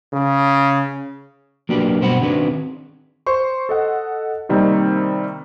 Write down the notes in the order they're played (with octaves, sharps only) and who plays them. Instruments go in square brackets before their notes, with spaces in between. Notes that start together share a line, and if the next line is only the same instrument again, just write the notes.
[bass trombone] C#3
[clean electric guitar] F#3 A#3 D4 G4 B4
G2 B2 C4 C5 F#5 B5
D#3 C4 D4 F#4 G#4 B4
[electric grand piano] C5 C6 C#6
A4 D#5 F#5
C3 D#3 G3 A#3 C4 D#4